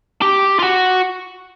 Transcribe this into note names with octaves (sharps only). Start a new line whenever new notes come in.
G4
F4
F#4